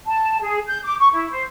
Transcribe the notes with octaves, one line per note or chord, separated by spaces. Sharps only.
A5
G#4
G6
D6
C#6
E4
C5